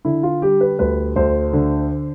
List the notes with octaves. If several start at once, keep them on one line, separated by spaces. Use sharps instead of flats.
D3 E4
F4
G3 G4
B4
D2 B4
D2 C5
D3